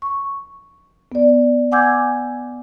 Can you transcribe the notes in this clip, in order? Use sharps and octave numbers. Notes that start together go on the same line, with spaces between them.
C#6
B3 D5
F#5 G#5 D6 E6 G6 G#6